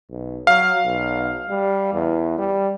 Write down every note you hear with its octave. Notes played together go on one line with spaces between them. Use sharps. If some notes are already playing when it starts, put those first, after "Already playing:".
B1
F#3 F5
B1
G3
E2
G3